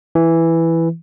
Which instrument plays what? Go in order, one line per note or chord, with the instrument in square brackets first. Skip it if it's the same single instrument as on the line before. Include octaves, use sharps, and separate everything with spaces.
[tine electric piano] E3